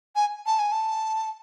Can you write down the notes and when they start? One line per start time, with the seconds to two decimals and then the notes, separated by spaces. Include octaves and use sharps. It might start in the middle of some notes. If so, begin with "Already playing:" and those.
0.15 G#5
0.46 A5
0.59 G#5
0.72 A5